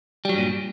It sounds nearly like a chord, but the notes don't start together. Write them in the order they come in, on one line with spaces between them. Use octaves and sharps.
G3 F#3 G2 A#2